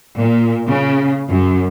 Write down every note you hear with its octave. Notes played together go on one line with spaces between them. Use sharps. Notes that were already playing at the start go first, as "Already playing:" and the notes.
A#2
C#3
F#2